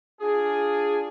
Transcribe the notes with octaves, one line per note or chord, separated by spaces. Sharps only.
D4 F4 G#4